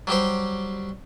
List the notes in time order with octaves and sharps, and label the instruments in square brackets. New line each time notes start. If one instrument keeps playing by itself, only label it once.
[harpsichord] F#3 G3 G4 C5